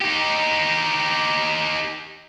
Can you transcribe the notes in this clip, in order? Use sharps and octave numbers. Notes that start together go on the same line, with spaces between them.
D#4 G4